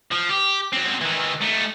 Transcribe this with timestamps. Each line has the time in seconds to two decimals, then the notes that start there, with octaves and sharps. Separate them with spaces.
0.12 F3
0.30 G4
0.73 F#3 C4
1.01 D#3 E3
1.41 A3 D#4